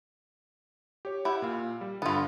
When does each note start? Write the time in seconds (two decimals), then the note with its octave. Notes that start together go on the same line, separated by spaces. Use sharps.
1.05 G4 C#5
1.25 E4 G4 F#5
1.42 A#2 F5
1.81 G3
2.02 G2 D3 B3 F4